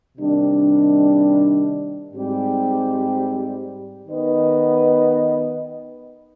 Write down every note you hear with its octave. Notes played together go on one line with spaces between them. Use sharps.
C3 D#3 G3 D4
G#2 G3 C4 G4
D#3 B3 D#4 B4 D#5